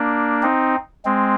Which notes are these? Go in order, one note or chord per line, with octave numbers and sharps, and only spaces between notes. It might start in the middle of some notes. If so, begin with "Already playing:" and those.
Already playing: A#3 D4
C4 D#4
G#3 C4